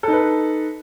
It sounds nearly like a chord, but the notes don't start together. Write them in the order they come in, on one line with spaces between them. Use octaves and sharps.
A4 D#4 B4